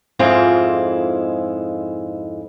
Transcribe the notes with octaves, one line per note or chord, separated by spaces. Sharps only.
F2 G#2 G#3 C4 E4 F4